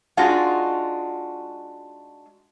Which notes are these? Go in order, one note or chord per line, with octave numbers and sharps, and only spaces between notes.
G#3 D4 D#4 F4 F#4